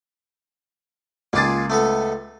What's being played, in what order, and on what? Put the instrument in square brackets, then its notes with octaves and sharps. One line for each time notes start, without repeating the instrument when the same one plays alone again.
[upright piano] C#2 D6 A6 [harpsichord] A#3 F4 G#4
[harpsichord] A3 B3 A4